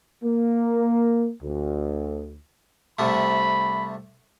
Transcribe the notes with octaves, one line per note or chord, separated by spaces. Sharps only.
A#3
D2
C2 C3 A3 B5